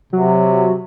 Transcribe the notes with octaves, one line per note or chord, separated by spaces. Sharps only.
C3 F#3